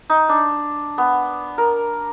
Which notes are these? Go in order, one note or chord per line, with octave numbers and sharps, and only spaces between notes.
D#4
D4
B3
A#4